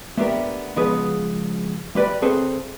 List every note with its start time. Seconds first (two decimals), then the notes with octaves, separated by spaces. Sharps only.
0.17 A3 B3 D4 G4 A#4
0.76 C#3 F3 G#3 B3 G#4 B4
1.95 G3 G4 B4 D5 B5
2.22 D2 C4 G#4 A4 B4 C5